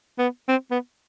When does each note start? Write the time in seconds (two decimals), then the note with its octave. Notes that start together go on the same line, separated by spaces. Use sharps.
0.19 B3
0.49 C4
0.71 B3